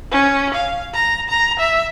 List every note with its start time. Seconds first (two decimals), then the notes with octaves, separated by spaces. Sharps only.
0.11 C#4
0.54 F5
0.94 A#5
1.29 A#5
1.59 E5